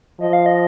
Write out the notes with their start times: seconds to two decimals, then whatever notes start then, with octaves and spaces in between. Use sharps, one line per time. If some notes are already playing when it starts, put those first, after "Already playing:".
0.20 F3 D#5
0.33 F5
0.46 D#5